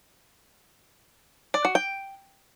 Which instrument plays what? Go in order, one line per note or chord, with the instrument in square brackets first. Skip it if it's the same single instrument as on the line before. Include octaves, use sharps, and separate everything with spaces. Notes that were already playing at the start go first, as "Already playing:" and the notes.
[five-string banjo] D5
F#4
G5